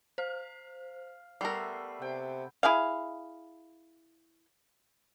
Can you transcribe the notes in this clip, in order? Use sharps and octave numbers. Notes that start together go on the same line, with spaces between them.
C5 F5
G3 A3 B3 A#4 E5 C7
C3 G5
E4 G#4 F5